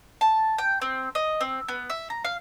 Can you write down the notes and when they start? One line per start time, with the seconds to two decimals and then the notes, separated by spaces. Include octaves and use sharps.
0.21 A5
0.58 G5
0.81 C4
1.15 D#5
1.41 C4
1.68 B3
1.90 E5
2.10 A#5
2.24 F5